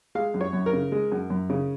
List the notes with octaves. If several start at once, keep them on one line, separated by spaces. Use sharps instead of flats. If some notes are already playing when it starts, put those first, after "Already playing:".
G#3 F5
F#2
C#5
F#2
A#4
C#3
G#3
F#2
F#2
C#3